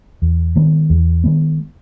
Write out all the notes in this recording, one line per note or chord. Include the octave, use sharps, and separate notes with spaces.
E2
D#3 G#3 B3
E2
D#3 G#3 B3